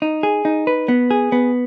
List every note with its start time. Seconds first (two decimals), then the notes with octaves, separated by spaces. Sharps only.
0.02 D#4
0.23 G#4
0.45 D#4
0.67 B4
0.88 B3
1.11 G#4
1.32 B3